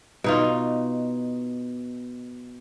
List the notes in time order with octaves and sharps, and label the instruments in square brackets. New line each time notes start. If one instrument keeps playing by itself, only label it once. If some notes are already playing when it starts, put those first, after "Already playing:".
[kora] B2 D#4 F4